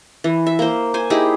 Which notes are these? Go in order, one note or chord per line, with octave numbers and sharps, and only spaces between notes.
E3
E5
A#3 C5
C5 G#5
D#4 E4 G4 G#4